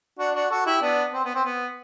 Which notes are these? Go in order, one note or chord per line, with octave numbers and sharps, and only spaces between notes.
D4 F#4
D4 F#4
F#4 A4
E4 G4
B3 D4
C4
B3
C4
B3